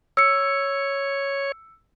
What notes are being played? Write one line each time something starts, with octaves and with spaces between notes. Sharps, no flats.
C#5 E6 C#7